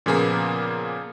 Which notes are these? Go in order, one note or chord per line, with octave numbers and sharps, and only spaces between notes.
A#2 C#3 F3 A#3 B3 G#4